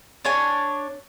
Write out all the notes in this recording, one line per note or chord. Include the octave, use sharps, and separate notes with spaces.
D4 C#5 G#5